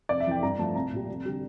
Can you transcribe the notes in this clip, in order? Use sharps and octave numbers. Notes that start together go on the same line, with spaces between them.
F1 D5
E5
F2 E3 G5
G2 A#5
F3 A3 C4 A5
C2 A#5
A#2 G3
F1
D3 G3